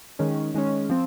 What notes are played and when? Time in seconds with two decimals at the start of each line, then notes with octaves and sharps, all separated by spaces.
0.19 D#3 G#3 C#4
0.54 D#3 G#3 C#4
0.89 F3 C4